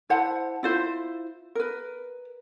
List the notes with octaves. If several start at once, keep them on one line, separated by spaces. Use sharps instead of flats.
E4 C5 F#5 A5
E4 F4 C5
A#4 B4